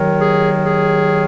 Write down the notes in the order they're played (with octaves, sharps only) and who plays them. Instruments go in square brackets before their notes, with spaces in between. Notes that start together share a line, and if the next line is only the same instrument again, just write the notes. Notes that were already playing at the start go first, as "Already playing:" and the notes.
Already playing: [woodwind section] D#2 D#3 F#3
G#4
G#4